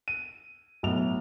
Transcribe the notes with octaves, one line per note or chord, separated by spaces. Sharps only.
D#7
B1 A2 F7